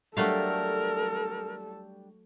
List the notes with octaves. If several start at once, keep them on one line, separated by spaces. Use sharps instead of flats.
F#3 G3 A3 D4 G4 A4 A#4 F5